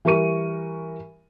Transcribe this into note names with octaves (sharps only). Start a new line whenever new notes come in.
E3 G3 A#4 C#6 D#7